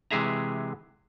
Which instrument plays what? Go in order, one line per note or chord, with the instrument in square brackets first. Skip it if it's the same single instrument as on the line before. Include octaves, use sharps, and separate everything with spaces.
[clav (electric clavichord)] C3 E3 G#3 G#4 E5 A#5